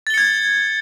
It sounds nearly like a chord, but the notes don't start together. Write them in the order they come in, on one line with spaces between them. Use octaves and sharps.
A6 G7 C#7 G#6